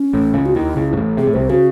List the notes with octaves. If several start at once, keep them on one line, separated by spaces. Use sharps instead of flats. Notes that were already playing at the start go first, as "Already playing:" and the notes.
Already playing: C#4
A1 A2
C#2 C#3
F#4
D#2 D#3 E4
C#2 C#3
G#2
A1 A2
C3 G#4
A2
C2 C3 C5
C#3 F#4